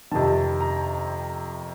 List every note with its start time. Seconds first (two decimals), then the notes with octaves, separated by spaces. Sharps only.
0.11 F2 C3 D#3 A5
0.61 A#5